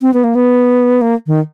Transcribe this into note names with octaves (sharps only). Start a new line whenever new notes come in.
C4
B3
A#3
B3
A#3
D#3